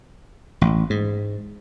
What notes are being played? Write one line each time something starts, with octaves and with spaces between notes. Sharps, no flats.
A1
G#2